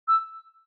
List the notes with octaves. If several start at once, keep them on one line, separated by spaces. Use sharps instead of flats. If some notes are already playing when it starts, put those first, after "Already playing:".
E6